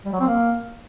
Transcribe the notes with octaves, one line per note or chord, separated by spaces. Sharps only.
G3
F#3
C4
A#3